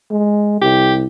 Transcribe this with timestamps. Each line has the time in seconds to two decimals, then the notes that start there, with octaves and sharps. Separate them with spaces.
0.11 G#3
0.61 C2 G4